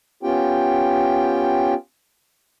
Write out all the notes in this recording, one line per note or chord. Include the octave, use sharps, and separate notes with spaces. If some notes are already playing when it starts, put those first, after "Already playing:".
B3 C#4 F4 G4 G5